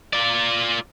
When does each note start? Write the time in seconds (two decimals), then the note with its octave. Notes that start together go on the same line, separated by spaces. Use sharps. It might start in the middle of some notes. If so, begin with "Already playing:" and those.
0.13 F4 D5